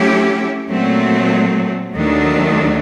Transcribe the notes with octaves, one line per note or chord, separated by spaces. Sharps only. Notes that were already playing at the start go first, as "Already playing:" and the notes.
Already playing: F#3 A3 C#4 E4 G4
A#2 F#3 A3 C4
D#2 D#3 F#3 A3 D4